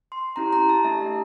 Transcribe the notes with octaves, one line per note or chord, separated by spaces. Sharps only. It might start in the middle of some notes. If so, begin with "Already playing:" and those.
C6
C#4 E4 G4 A#5
A#5
A5
A3 D4 G4 E5